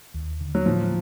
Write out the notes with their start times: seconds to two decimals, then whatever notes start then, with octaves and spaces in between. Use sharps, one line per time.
0.14 D#2
0.41 D3
0.55 F#3
0.66 A2 F3